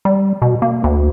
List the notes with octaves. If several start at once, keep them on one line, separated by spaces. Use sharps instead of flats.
G3
B2
A#3
D2